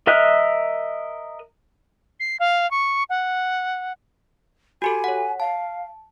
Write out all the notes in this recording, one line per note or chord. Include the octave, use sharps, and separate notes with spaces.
A#4 D#5 E5 F6 F#6
C7
F5
C#6
F#5
F#4 G4 A4 G#5
C#5 F#5
F5 A5